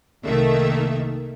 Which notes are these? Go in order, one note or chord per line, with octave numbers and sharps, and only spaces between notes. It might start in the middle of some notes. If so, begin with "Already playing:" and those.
C2 D#3 A3 A#3 E5